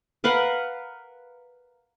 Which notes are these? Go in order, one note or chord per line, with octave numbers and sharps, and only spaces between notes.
A#4 B4 F5 F#5